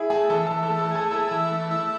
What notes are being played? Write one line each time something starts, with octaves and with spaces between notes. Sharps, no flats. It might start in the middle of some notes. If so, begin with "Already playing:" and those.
Already playing: E4 G#4
A3 G#4
E3 A4
A4
E3
A4
A3
A4
G#4 A4
E4 A4
E3 A4
A3
E4